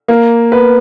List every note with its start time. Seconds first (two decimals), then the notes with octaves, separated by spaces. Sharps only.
0.08 A#3 A#4
0.52 B3 B4